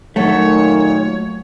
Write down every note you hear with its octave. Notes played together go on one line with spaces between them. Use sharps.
D#2 A#2 D#3 F#3 A3 C#5 A5